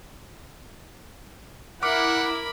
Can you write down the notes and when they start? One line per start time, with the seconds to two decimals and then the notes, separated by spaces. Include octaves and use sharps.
1.83 E4 A#4 F#5 B5 D6 F6